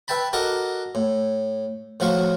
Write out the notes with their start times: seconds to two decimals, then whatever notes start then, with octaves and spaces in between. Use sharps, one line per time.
0.08 B4 E5 G5 A5 B5
0.33 F#4 A4 A#4 D#5 F#5 D6
0.95 A2
2.00 A2 F3 F#4 F5 C#6